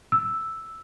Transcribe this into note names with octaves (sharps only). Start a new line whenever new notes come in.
E6